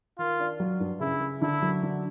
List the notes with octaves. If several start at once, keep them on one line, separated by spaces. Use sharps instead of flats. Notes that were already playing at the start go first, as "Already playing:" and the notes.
D#3 F4
D4
F#3
G2
C#3 E4
C#3
D3 E4
F#3
D3